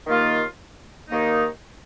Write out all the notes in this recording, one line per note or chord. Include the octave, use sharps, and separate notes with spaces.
D#2 D#3 A#3 F4
D#2 D#3 A#3 D#4